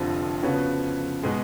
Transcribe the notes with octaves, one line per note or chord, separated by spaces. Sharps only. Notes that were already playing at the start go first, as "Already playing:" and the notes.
Already playing: F1 F2 D3 F3
C#3 F3 B3 F#4 C#5
B2 G#3